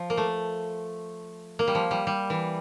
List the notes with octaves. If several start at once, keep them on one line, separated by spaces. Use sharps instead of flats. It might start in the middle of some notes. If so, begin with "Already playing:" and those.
Already playing: F3
A#3
A3
A#3
G3
F3
G3
G3
E3